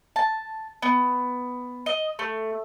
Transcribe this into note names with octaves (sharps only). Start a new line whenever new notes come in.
A5
B3
D#5
A3